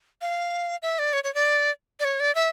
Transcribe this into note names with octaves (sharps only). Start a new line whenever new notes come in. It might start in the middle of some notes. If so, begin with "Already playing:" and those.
F5
E5
D5
C#5
C#5
D5
D5
C#5
D5
E5